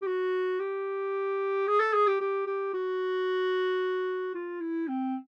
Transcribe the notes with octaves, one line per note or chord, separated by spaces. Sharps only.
G4
F#4
G4
G#4
A4
G#4
G4
G4
G4
F#4
F4
E4
C4